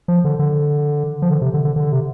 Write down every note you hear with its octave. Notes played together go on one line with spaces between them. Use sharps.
F3
D3
D3
F3
D3
C3
D3
D3
D3
C3